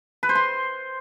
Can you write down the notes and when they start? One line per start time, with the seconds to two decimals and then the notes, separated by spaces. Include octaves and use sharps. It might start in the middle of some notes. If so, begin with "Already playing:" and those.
0.23 B4
0.29 C5
0.35 C6